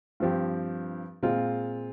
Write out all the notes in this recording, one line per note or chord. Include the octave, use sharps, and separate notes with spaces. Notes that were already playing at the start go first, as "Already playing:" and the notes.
G2 F3 C4 G4
A#2 G#3 C4 F4